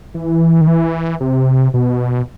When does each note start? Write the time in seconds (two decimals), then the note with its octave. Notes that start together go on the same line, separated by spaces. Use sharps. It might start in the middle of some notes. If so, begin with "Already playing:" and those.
0.14 E3
0.61 D#3
0.67 E3
1.20 C3
1.74 B2